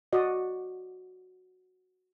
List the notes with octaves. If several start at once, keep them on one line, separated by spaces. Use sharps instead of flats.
F#4 D5 D#5